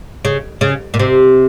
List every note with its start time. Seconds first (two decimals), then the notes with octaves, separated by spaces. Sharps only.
0.25 C#3
0.61 C#3
0.94 A#2
0.99 C3